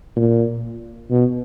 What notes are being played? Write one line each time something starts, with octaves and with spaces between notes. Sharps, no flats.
A#2
B2